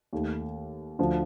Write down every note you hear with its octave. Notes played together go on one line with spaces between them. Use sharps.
D#2 D#3 A3
D2 D3 F3